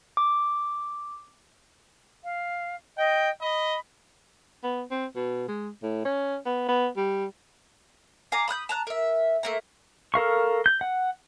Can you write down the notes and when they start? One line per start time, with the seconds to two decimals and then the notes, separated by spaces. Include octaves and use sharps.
0.17 D6
2.24 F5
2.98 D#5 G5
3.41 D#5 B5
4.63 B3
4.91 C4
5.15 B2
5.48 G#3
5.83 A2
6.05 C#4
6.46 B3
6.68 B3
6.97 G3
8.32 F5 G#5 A#5 D6
8.48 B5 D#6 F#6 G6
8.69 A5 A#5 F#6
8.87 A#4 E5
9.43 A3 A#3 A#5
10.14 A4 A#4 F5 C#6
10.66 G6
10.81 F#5